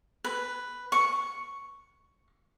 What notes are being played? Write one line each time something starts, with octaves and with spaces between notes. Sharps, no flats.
B4
C#6